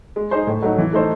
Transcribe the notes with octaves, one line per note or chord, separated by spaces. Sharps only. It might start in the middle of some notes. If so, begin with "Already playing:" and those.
G#3
D#4 G#4 C5
A2
F#3 A3 D#4
E3
A3 D#4 A4 C5